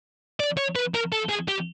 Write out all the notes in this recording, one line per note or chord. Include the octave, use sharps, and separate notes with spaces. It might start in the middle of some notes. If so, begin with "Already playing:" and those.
D5
C#5
B4
A#4
A4
G#4
G4